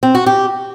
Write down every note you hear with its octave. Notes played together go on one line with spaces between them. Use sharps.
C4
F#4
G4